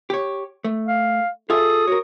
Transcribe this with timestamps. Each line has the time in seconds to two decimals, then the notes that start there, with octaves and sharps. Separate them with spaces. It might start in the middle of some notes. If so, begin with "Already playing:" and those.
0.10 G4 C#5
0.64 A3
0.88 F5
1.50 F4 G#4 A4 E5 D#6
1.87 F#4 A#4 C#5